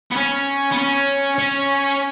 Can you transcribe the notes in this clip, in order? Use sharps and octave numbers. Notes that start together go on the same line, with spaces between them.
B3
C#4
B3
C#4
C#4